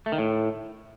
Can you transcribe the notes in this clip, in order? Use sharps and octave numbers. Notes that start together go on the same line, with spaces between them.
A3
D#3
A2